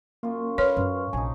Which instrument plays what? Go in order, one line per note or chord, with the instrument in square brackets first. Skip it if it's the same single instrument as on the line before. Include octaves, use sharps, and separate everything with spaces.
[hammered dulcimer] F#2 F4 [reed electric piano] A#3
[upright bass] C#4 [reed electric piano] B4 C6 F6 [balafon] C#5 [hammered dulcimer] B5
[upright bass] F#2 [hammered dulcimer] C#4
[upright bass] A#1 C3 [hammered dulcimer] F3 D#4 [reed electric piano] G#5